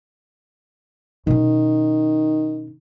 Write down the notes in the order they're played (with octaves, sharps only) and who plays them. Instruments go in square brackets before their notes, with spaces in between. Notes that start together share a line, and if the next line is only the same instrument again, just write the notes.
[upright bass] B2 C#4 [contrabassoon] D#3